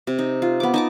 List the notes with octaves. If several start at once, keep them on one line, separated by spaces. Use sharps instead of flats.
C3
D#4
F4
B3 D6
D#4 A5 D6